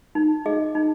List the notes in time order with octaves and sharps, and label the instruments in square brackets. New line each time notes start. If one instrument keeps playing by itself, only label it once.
[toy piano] D#4
G#4 D#5
D#4